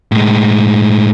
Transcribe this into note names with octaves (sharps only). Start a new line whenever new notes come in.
A2 G#3